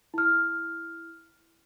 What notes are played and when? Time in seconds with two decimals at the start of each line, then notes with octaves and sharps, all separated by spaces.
0.14 E4 F6